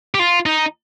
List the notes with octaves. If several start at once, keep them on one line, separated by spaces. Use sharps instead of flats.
G4
F4
D#4